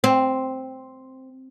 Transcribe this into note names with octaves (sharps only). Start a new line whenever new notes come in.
C4